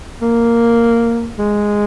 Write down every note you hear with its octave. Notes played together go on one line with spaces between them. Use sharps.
A#3
G#3